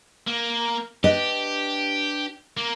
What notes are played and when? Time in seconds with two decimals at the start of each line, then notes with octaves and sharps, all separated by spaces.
0.27 A#3
1.04 D4 G4 B4 D#5
2.57 A#3